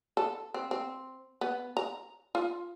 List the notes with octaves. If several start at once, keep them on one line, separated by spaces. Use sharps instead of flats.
A4
C4
C4
B3
A#5
F4